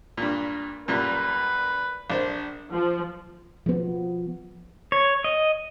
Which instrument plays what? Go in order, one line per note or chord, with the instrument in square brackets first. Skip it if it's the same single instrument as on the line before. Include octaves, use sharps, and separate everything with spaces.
[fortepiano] G2 A#2
[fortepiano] F#2 A#2 G3 [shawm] B4
[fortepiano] A#1 D4 C5
[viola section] F3
[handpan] F3 B3
[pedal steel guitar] C#5
D#5